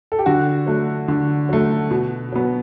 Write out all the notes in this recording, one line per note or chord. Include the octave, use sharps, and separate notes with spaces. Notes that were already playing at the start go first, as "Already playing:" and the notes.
A4
G4
D3 F#4
F#3 A3
D3
F#3 A3
B2
F#3 B3